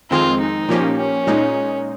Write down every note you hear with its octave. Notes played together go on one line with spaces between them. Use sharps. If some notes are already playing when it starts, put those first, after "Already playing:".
F2 D#3 G#3 C4 F4
D#4
A#2 F3 A#3 C#4 G4
C#4
A#2 G#3 D#4